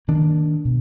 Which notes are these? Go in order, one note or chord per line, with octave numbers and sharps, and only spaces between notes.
D#3 A#3 D4
B2